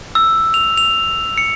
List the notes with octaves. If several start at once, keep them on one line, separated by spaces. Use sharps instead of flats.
E6
F7
F7
C#7